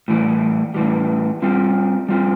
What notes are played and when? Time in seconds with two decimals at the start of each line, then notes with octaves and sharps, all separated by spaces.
0.08 A2 E3 G3
0.74 A2 E3 G3
1.42 G3 C4 F4
2.09 G3 C4 F4